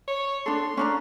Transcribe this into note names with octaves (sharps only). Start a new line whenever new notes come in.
C#5
D4 A4 C6
C#4 D4 A#5